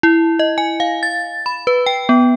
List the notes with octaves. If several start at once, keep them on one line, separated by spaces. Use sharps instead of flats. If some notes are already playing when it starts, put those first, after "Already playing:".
E4
D#5
G#5
F5
A6
B5
B4
G5
B3